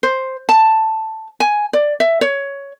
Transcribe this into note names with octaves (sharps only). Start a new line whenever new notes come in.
C5
A5
G#5
D5
E5
C#5